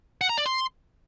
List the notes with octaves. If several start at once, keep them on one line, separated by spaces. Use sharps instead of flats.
F#5
A#5
D5
C6